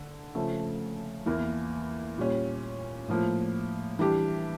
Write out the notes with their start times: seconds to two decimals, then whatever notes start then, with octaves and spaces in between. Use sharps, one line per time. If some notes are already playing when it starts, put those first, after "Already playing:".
Already playing: D3
0.35 C#3 F3 A3
1.26 E2 E3 A#3 E4 A#4
2.18 A#2 G3 C#4
3.09 A2 F3 A#3
3.99 E3 G3 D4 G4